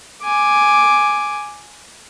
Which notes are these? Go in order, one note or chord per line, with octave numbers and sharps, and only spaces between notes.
G#5 D6